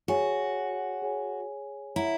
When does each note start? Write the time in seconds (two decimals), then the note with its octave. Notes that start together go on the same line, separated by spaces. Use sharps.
0.08 F#4 G#4 C#5 G#5
1.02 G#4 C#5 G#5
1.95 E4 C#5 F#5 A#5